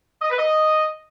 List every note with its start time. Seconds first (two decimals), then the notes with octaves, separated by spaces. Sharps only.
0.22 D#5
0.30 B4
0.38 D#5